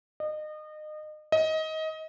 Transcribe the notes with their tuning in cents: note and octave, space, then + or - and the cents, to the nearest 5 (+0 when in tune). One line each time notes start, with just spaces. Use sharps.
D#5 -30
D#5 +25